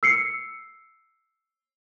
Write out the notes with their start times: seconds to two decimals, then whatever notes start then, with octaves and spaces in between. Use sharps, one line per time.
0.03 E6 C7 C#7